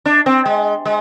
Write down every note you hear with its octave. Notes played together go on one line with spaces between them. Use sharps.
D4
C4
G#3
G#3